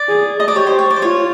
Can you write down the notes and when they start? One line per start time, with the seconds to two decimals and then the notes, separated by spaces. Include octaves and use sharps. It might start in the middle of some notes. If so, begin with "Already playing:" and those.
Already playing: D5
0.09 G#4
0.40 D#5
0.48 D5
0.55 G4 C#5
0.67 C5
0.79 C#5
0.91 D5
0.96 C5
1.02 F4 C#5